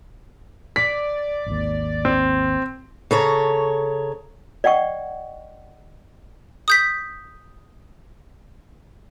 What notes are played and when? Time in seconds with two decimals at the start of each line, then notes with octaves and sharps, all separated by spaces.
0.76 D5 B6
1.46 G#1 D#2
2.05 C4
3.11 C#3 A4 C#5 A#5
4.64 D5 D#5 F#5 G5 C#6
6.68 D#6 G6 B6